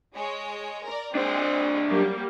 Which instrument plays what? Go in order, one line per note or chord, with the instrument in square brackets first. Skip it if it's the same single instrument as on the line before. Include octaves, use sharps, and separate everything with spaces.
[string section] G#3 C#5
A#4 D5
[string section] G#3 C4 [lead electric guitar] D4 C5
[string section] F#3 G3 A#3